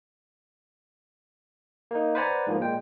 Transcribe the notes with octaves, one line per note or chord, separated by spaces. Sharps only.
A#3 D#4
B4 C5 D5 F#5 G#5 A#5
G#2 F3 A#3
A#2 G#3 G5